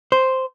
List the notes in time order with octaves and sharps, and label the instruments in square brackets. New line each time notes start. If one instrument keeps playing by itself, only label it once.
[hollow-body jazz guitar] C5